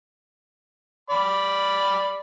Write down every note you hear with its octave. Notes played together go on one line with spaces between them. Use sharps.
D5 B5